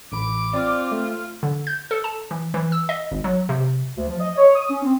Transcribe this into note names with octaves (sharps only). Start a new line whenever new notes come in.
A1 B5 D6 D7
C4 F4 D5
A3
D3
G6
A4
A5
E3
E3
E6
D#5
G#1
F#3
C3
D2
F3
D#5
C#5
D#6
C#4
C4